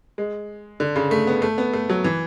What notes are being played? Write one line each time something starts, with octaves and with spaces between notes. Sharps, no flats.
G#3
D3
C#3
A3
B3
A3
B3
A3
F#3
E3